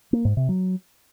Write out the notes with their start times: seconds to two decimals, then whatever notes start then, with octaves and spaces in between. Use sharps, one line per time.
0.13 A#3
0.25 G#2
0.37 C3
0.49 F#3